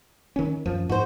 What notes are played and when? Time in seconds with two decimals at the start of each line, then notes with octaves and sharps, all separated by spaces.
0.36 D#3 C#4
0.66 F#2 F3
0.89 G#2 F#4 C5